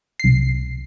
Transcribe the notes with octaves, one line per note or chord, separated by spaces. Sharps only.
C2 C7